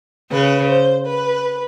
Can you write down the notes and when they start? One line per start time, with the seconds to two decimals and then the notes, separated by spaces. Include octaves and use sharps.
0.31 C#3 B4
0.69 C5
1.06 B4